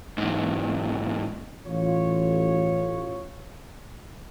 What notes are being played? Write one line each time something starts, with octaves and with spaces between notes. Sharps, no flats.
B1 G#2
A1 F4 C#5